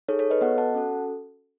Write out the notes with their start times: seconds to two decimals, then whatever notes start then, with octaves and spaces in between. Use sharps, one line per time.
0.08 D#4 G#4 A4 C#5
0.19 A4 C#5
0.30 B4 D#5
0.41 B3 F#4 A4 D#5 F#5
0.58 F#5 A5
0.75 C#4 F#4 A4